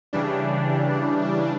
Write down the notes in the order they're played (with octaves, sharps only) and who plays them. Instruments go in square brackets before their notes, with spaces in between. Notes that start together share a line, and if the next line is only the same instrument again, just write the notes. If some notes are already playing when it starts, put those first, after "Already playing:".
[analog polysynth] C#3 E3 G3 D4